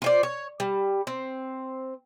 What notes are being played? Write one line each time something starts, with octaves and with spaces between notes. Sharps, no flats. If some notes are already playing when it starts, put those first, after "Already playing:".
F4 C5 D5
C#5
G3
C4